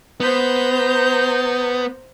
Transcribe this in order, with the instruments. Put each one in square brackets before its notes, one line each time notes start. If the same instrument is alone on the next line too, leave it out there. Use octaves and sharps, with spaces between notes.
[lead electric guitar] B3 [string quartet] C5 A#5 G6